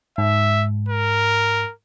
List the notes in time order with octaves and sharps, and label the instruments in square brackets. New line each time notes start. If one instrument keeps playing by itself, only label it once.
[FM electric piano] G#2 [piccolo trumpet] E5
[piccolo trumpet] A#4